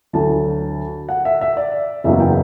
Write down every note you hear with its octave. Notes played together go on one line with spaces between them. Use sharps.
D2 D3 F#3 A5
F#5
E5
E5
D5
F#1 E2 C#3 F#3 E5
G5